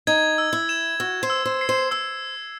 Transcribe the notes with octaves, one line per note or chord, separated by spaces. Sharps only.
D#4 G#6
E6
E4
E7
F#4 E6
C5
E6
C5
C7
C5
C5 E6